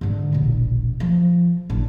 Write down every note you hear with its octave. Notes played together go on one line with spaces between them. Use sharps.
G#2 D3
E1 A#1
F3
A1 D4